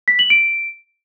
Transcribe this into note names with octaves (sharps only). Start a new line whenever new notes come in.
B6
F#7
D7